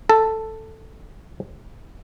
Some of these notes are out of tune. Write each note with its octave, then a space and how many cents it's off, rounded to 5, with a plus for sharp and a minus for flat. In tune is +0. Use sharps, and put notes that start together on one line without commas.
A4 +5